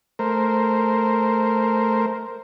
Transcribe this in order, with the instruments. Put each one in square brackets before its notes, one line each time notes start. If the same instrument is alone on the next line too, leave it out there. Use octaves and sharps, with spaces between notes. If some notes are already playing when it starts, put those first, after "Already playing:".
[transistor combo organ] A3 A#4 C5